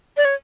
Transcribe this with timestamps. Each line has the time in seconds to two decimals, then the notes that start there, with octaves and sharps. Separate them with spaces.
0.17 D5
0.25 C#5